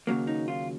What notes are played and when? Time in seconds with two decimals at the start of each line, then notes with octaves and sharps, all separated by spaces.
0.07 D#2 C#3 F#3 A#3
0.27 D#4
0.48 F4